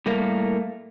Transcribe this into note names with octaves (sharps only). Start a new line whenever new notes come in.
A2 G3 A3 A#3 A#4